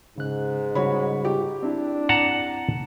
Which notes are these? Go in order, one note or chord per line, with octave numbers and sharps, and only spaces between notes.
G#2 C#3 F#6
C#3 G3 F#4 C#5 B5
G4
C4 D4 E4
F#5 A5 A#5